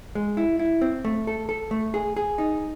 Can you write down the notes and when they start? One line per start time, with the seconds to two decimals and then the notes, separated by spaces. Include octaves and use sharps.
0.15 G#3
0.37 E4
0.59 E4
0.82 C4
1.05 A3
1.27 A4
1.49 A4
1.71 A3
1.94 G#4
2.17 G#4
2.38 D#4